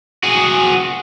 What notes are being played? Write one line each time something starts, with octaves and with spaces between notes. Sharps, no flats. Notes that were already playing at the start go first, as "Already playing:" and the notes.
F#4 G#4